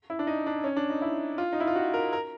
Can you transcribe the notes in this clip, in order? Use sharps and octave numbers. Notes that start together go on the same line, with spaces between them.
E4
D4
D#4
D4
C#4
D4
D#4
E4
F4
D#4
E4
F4
F#4
A#4
A#4